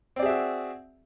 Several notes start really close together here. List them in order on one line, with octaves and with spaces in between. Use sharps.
C4 D5 G#4 E5 F#4